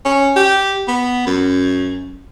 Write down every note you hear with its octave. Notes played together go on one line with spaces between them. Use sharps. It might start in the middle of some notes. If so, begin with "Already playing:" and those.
C#4
G4
B3
F#2